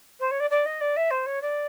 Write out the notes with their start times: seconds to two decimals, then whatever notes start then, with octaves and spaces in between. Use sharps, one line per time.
0.19 C5
0.31 C#5
0.39 D5
0.50 D5
0.65 D#5
0.80 D5
0.96 E5
1.10 C5
1.26 C#5
1.41 D5